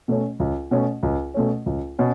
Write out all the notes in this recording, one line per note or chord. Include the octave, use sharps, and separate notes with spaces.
B2 A3 C#4
C#2
B2 A3 C#4
C#2
B2 A3 C#4
C#2
B2 C#4